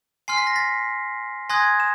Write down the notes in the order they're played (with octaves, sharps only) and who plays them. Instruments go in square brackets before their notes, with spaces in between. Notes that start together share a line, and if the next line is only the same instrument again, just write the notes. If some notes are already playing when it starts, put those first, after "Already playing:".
[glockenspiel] G#5 C6 F6 C7
B6
A#6
A6 B6
G#5 C6 D#6 F#6 G#6 A#6
E7